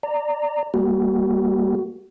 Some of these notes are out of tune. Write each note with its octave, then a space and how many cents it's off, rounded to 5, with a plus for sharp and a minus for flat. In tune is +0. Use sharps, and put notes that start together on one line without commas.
D5 +0 A#5 -20
G3 +15 A#3 +0 F#4 +25